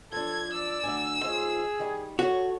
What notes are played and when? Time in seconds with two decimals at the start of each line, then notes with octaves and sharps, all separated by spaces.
0.12 F3 D4 A4 G#6
0.52 D5 E6
0.84 D2 D4 G#5
1.24 D#3 F4 G#4 C5
1.79 D#3 G3
2.19 F#4 A4 C#5